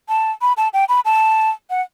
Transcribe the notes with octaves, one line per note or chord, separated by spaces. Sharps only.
A5
B5
A5
G5
B5
A5
F#5